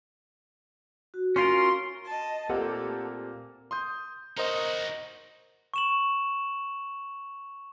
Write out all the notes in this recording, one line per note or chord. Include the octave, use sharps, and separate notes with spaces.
F#4
C#4 F4 A#4 C6
D#5 A5
A#2 A3 A#3 C4 G4 A4 F#5
C6 D#6 G6
D#4 F#4 A#4 C5 D#5
C#6 E7 F#7